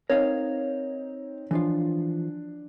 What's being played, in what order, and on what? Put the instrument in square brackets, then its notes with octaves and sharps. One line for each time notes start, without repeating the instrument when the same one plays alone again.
[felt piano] C4 D#4 [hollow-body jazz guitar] A#4 D#5 F5 [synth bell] C#5
[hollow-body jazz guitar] E3 F3 F4 [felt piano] D4